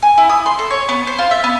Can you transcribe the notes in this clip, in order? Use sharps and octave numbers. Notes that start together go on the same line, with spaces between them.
G#5
E4
D#6
C6
A4
C#5
B3
C5
F4
E5
B3